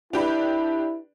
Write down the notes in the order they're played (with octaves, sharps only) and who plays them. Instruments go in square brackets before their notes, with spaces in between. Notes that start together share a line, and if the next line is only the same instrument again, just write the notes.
[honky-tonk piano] D4 G4 B4 [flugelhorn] E4